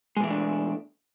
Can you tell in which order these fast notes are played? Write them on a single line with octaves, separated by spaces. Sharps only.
G#3 B2 E3 A3 D4